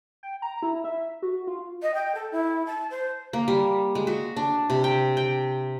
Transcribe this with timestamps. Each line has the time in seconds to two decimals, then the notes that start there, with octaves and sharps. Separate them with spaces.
0.23 G5
0.42 A#5
0.63 E4
0.84 E5
1.22 F#4
1.47 F4
1.82 D#5
1.94 G5
2.15 A4
2.32 E4
2.67 A5
2.91 C5
3.33 A#3
3.48 G3
3.95 G#3
4.07 F#4
4.37 D4
4.70 C3
4.84 G5
5.17 G5